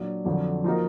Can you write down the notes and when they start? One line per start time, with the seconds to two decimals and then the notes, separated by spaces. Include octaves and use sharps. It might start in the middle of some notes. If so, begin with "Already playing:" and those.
Already playing: A#2 F#3 D4
0.25 F2 D3 F#3 D4
0.64 F3 A#3 D#4 F#4 A#4